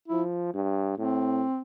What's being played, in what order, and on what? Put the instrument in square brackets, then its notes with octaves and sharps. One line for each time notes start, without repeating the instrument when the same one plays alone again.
[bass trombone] F3 [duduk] E4
[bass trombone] G2
[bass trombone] A2 [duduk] C4